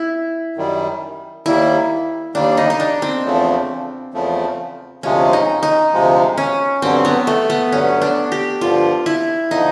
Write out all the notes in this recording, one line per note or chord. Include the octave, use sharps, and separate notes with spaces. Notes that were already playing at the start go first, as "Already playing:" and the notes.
Already playing: E4
F#2 D#3 G3
D#2 D#3 G3 A#3 E4
D#2 D#3 G3 A#3 D4
D#4
D#4
D4
C4
E2 C#3 F3 A3
E2 C#3 F3 A3
D2 C3 F3 G#3 C#4
D#4
D#4
D2 C3 F3 G#3
C#4
G2 D3 F#3 C4
B3
A3
B3
G2 D3 F#3 C#4
D4
G4
G2 D3 F3 F4
E4
D3 F3 D#4